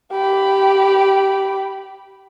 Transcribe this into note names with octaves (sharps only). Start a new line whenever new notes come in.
G4 B5